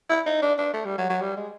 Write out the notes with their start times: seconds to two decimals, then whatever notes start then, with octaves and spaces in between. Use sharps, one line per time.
0.09 E4
0.26 D#4
0.42 D4
0.58 D4
0.74 A3
0.85 G3
0.98 F#3
1.10 F#3
1.21 G3
1.37 G#3